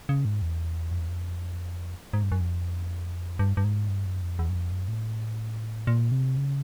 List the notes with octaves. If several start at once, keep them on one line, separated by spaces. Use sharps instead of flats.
C#3
G#2
E2
F2
E2
F2
G#2
G2
F#2
F2
G2
G2
G#2
G2
F#2
F2
E2
F#2
F2
F#2
A2
A#2
C3
C#3